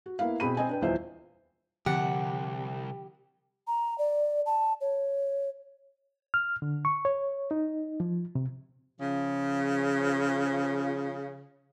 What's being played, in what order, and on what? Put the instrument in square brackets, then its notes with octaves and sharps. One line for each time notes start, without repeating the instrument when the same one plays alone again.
[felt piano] F#4
A#3 B3 E4 F5
B2 C4 G#4 B5 D#7
C4 D#5 G#5
D4 B4 G5
D#1 E2 F4 C5 D#5 E5
[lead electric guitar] C2 [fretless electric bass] D3 F3 C4 [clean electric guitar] G4 [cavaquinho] F#5
[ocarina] A#5
D5
A5
C#5
[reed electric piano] F6
D3
C#6
C#5
D#4
F3
C3
[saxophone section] C#3 F3